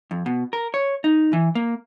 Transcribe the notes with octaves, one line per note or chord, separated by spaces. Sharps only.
F2
B2
A#4
C#5
D#4
E3
A#3